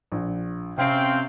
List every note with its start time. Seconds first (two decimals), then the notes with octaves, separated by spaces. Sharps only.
0.12 A#1
0.78 C3 C4 C#4 F5 G5